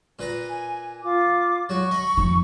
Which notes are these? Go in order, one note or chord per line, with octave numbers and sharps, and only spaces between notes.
A#2 B4 A#5
G#5
F4 D6
F#3 F#4 C#6
D#5 B5
F2 D#3